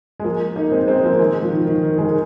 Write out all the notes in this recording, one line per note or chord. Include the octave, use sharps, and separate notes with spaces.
G#3
F3 A#3
A#3 D#4
G#3 C4
G#3 C4
F3 A#3
D#3 G#3
F3
D#3
F3
D#3
D#3
D#3 G#3
D#3